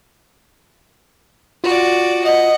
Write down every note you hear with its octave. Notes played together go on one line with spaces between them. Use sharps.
F4 F#4 D5
D#5 F#5